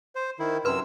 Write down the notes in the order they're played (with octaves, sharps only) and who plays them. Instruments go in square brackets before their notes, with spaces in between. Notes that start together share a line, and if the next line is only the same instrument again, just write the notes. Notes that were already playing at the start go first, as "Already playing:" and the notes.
[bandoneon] C5
D#3 E4
[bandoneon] F#2 C3 E6 [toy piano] B4 C6